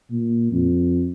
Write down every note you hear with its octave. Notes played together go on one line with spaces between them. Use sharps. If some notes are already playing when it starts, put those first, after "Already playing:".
A#2
F2